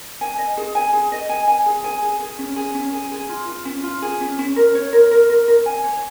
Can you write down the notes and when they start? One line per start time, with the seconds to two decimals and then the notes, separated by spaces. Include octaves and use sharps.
0.21 G#5
0.38 D#5
0.57 G#4
0.75 G#5
0.93 G#4
1.12 D#5
1.29 G#5
1.48 G#5
1.66 G#4
1.84 G#5
2.02 G#4
2.20 G#4
2.39 C#4
2.56 G#4
2.74 C#4
2.93 G#4
3.12 G#4
3.29 F4
3.48 F4
3.65 C#4
3.83 F4
4.02 G#4
4.20 C#4
4.39 C#4
4.56 A#4
4.75 C#5
4.93 A#4
5.11 A#4
5.30 A#4
5.48 A#4
5.66 G#5
5.84 C#5